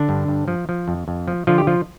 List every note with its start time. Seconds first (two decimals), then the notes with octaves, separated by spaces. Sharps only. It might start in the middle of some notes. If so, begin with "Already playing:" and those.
Already playing: D3 D4
0.09 G2
0.28 G2
0.48 F3
0.69 F3
0.88 F2
1.08 F2
1.28 F3
1.47 D3 F3 F4
1.58 G4
1.67 F3 F4